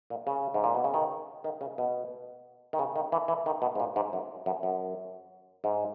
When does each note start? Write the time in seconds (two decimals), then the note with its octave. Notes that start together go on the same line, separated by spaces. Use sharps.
0.10 A#2
0.27 C#3
0.54 G#2
0.64 A#2
0.75 B2
0.84 C#3
0.94 D#3
1.44 D#3
1.61 C#3
1.78 B2
2.73 D#3
2.79 C#3
2.96 D#3
3.12 E3
3.28 E3
3.46 D#3
3.62 B2
3.75 G#2
3.80 A#2
3.96 G#2
4.13 F#2
4.46 F#2
4.63 F#2
5.64 G#2